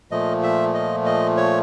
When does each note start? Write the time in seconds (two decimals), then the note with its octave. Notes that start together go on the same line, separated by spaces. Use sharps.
0.11 A#2 F3 A3 D#5
0.43 E5
0.74 D#5
1.06 D#5
1.37 C#5